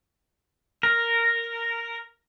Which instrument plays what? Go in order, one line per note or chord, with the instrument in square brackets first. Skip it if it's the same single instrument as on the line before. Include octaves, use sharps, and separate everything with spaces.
[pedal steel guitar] A#4